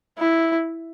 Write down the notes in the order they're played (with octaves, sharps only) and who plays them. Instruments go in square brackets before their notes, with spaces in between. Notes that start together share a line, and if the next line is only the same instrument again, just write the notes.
[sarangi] E4